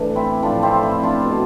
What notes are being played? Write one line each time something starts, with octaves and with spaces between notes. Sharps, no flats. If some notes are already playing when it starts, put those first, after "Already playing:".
Already playing: A2 E3 D4
C4 E4
A2 F3 D4 F4
C4 E4
C4 E4
D4 F4
B2